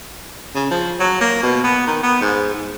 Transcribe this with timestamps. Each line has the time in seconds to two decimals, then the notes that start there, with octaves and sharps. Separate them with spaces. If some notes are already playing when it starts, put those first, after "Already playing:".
0.55 C#3
0.71 F3
1.00 F#3
1.21 A#3
1.43 B2
1.64 B3
1.87 D#3
2.03 B3
2.21 G#2
2.54 G#2